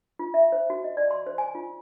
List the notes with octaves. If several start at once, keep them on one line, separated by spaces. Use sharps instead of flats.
F4
E5
C5
F#4
D#5
D5
C6
C5
G#5
F4